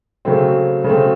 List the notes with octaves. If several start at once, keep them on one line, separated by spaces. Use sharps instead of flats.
C#3 F#3 A3 C4
C#3 F#3 A3 C4